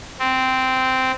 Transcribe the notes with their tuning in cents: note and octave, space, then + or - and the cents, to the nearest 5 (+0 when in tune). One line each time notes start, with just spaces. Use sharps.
C4 -10